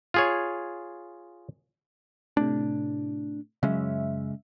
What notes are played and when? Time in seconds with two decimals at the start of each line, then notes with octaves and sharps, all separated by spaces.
0.14 F4 G#4 C#5
2.37 A2 C3 D4
3.63 F#2 C#3 G#3 C#4 E5